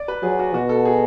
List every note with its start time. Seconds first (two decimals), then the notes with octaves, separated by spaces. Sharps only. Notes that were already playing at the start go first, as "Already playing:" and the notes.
Already playing: D5
0.08 B4
0.23 F#3 G#4
0.39 F#4
0.54 B2 F#4
0.69 A4
0.85 G#4